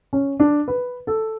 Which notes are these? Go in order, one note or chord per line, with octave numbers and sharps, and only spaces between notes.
C#4
D4
B4
A4